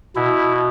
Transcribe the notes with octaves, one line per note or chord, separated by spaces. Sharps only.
B2 E4